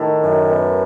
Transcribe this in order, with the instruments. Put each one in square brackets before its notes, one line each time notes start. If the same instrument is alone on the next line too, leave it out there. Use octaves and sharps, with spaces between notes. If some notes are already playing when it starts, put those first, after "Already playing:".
Already playing: [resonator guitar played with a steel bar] A2 [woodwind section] D#3
[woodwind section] F#2
B3